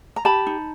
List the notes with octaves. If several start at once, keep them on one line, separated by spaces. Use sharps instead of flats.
A#5
G4 A5 B5
D#4